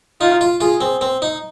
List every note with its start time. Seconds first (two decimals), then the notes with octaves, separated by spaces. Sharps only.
0.20 D#4 F4
0.41 F4
0.60 F4 G#4
0.81 C4
1.01 C4
1.22 D#4